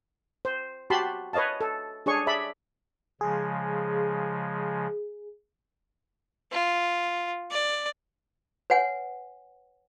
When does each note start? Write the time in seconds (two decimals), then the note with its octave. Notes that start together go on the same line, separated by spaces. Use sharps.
0.45 C5
0.90 F#4 G4 A5 B5 C6
1.33 B4 C#5 D#5 F5 A5
1.61 A4
2.06 D4 G#4 C#5 C#6
2.27 G#4 D5 E5 B5
3.21 C#3 F3 G#3 G#4
6.52 F4
7.51 D5
8.70 B4 C#5 F#5 G#5